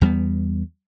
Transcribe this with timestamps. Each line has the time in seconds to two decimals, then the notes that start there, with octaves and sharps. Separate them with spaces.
0.01 E2 G3 A#3 B3